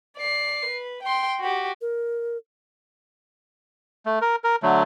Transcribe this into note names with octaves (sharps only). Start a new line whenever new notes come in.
D5 C7
B4
G5 C6
F#4 G4
A#4
A3
A#4
A#4
D3 F#3 A3